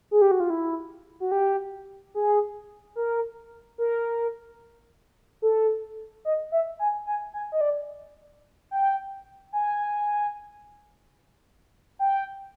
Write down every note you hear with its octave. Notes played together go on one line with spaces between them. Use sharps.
G#4
G4
F#4
F4
E4
F#4
G4
G#4
A#4
A#4
A4
D#5
E5
G#5
G#5
G#5
D#5
D5
G5
G#5
G5